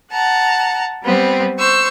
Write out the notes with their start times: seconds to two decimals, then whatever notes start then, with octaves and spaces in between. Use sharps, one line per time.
0.11 F#5 A5 A#5
1.03 G3 B3 C4
1.58 C5 C#6 E6